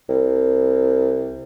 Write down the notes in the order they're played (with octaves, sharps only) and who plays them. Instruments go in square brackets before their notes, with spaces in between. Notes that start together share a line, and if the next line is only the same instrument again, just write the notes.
[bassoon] C2